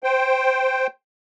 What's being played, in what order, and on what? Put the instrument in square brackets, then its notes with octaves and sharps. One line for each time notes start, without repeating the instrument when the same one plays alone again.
[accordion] C5 G5